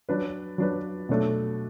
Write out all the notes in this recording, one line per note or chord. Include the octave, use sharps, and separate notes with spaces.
F#3 D4 B4
F#3 D4 B4
B2 F#3 A3 D4